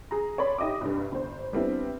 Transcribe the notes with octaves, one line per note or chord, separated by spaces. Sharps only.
G#4 A#5
C#5 D5 B5 C6
D#4 G4 D#5 E5 D6
C2 G2
G1 C5
G3 B3 C4 D4 E4